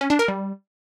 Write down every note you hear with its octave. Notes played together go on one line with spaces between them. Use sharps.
C#4
D4
A#4
G3